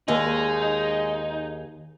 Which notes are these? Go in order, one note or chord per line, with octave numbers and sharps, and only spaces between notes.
D#2 G#3 D#4 G#4